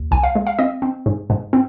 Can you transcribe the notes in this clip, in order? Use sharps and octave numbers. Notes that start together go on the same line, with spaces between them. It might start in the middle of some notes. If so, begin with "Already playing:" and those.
Already playing: D#2
C2 G#5
F5
G#3
F5
C4 D#5
C4
G#2
G#2
C4